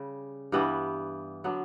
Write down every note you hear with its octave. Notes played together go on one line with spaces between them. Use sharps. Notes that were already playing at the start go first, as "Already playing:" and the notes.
Already playing: C#3 G3
G2 E3 G3 B3
D3 F#3 B3